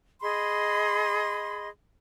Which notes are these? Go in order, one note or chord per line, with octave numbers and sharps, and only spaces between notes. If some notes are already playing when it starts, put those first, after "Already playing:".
G#4 D#5 B5 C6